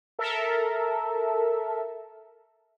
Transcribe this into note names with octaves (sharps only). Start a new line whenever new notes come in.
A4 A#4 E5